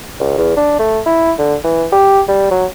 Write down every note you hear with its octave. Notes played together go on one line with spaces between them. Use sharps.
C#2
E2
D4
A3
E4
D3
E3
G4
G3
F#3